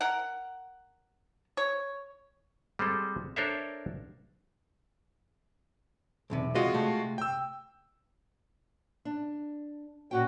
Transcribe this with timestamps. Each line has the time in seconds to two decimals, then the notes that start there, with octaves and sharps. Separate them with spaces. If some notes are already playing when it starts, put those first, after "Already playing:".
0.01 A#4 F#5
1.57 C#5
2.79 G3 G#3 C4 A4
3.36 D4 A4 A#4 C5 C#5 E5
6.30 B1 E2 C3
6.55 G#3 F4 F#4 D#5
6.74 C3 A3
7.18 G5 E6
9.05 D4
10.11 A#2 C#4 F#4 G5